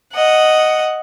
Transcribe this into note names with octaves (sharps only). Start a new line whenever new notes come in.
D#5 F#5